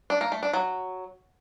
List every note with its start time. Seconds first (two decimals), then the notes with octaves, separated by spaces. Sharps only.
0.10 D4
0.21 A#3
0.32 A3
0.43 D4
0.53 F#3